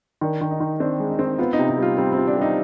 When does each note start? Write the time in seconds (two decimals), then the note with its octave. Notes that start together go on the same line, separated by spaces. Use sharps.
0.21 D#3 D4
0.41 D#3
0.51 D#4
0.60 D#3
0.80 C4 D4
1.00 G#3
1.10 D#4
1.19 C4
1.24 D#4
1.39 B3 F4
1.53 D#4
1.59 C3
1.69 D#4
1.78 G3 F4
1.97 G3 C4
2.12 C4
2.18 F4
2.27 D4
2.37 G3 D#4